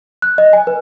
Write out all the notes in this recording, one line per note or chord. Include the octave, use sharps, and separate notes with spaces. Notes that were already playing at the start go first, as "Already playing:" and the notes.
F#6
D#5
G#5
B4